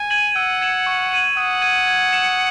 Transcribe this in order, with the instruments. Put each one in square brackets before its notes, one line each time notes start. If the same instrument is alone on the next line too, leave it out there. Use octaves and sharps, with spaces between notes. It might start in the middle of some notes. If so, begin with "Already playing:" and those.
Already playing: [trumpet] G#5
[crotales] G#6 D#7 F#7
[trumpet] F#5 [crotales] E6
[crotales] G#6 C#7 E7
C#6
G#6 D#7 F#7
[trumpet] F#5 [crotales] D#6
[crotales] G#6 D#7 F#7
G#6
C#7 E7